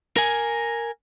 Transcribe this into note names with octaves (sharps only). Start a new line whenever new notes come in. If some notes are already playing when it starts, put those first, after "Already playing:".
A#4 G#5